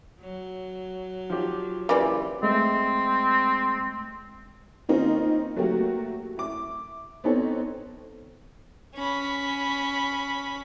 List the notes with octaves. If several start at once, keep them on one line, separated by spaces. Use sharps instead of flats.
F#3
F3 G4
C#3 E3 A#3 E4 F4 G4 D5
G#3 A3 C4
D#3 A#3 C4 C#4 D#4 F4
F#3 A3 A#3 F#4 G4
E4 D6
B3 C4 D#4 A4 C#5
C#4 B5